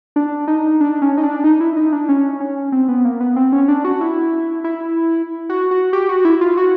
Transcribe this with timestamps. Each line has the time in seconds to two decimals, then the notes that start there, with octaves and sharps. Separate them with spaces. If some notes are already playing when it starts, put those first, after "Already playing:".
0.16 D4
0.48 D#4
0.81 D4
1.02 C#4
1.18 D#4
1.23 D4
1.44 D#4
1.60 E4
1.77 D#4
1.92 D4
2.09 C#4
2.40 C#4
2.72 C4
2.88 B3
3.05 A#3
3.20 B3
3.36 C4
3.52 C#4
3.68 D4
3.84 F#4
4.01 E4
4.64 E4
5.49 F#4
5.71 F#4
5.93 G4
6.09 F#4
6.25 E4
6.41 F4
6.57 F#4